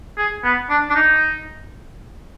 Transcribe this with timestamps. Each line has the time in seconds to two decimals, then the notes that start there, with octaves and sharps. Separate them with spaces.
0.18 G#4
0.44 B3
0.70 D4
0.90 D4
0.95 D#4